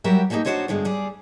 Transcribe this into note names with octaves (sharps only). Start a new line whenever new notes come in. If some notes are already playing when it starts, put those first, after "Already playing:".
F#3 G3 F#4 G4 A#4 E5
G3 A3 A#3 C#4 D#4 G4
D4 E4 F#4 C5 C#5 D#5
G2 D3 G#3 B3
G3 G#4 D5